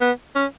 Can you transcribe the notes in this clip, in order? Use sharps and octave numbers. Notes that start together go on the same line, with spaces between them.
B3
C#4